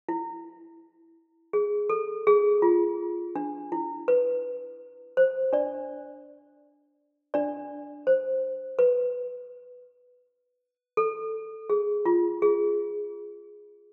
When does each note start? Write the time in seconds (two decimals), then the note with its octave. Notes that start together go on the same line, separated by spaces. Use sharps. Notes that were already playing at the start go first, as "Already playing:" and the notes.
0.09 E4
1.53 G#4
1.90 A4
2.27 G#4
2.62 F4
3.36 D4
3.72 E4
4.08 B4
5.17 C5
5.53 D4 D5
7.34 D4 D5
8.07 C5
8.79 B4
10.97 A4
11.70 G#4
12.06 F4
12.42 G#4